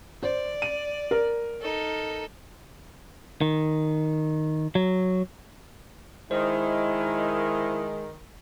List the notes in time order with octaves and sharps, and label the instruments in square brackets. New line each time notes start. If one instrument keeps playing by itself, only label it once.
[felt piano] C5 [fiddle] D5
[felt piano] D#7
A#4
[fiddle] D#4 A4
[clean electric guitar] D#3
F#3
[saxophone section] D#3 [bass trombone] G#3 [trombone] E4 [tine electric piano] C5